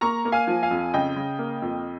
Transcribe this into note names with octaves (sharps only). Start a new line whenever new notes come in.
A#3 A#5 C#6
A#3
F5 G#5
F3
F5 G#5
F2
C#3 D#5 G5
C#3
A#3
F2